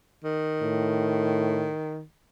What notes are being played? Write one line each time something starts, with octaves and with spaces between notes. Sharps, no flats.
D#3
A2